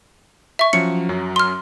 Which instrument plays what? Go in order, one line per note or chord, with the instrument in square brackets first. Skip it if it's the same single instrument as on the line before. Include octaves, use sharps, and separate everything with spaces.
[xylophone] E5 C#6
[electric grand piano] F3 F#3 C#4 [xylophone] C#7
[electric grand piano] F#2 F#3
[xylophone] C6 F6